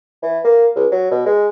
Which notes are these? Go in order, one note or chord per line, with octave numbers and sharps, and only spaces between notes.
E3
A#3
C#2
F#3
B2
G#3